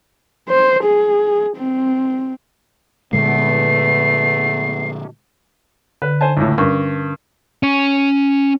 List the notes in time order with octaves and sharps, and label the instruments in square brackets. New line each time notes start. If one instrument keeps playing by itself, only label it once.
[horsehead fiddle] C5
G#4
C4
[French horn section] E2 A3 B3 [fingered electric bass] A#2 D3 G#3 [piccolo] C7
[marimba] D3 [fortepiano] B4
[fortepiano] C5 G#5 A5
C#2 A2
[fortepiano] G2 [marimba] C#4 A#4 C#6
[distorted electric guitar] C#4